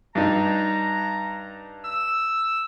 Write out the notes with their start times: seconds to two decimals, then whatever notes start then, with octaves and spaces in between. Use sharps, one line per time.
0.15 G2 D#4 A#5
1.85 E6